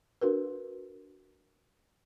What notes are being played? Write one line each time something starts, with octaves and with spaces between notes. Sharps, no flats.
D4 F#4 A#4 B4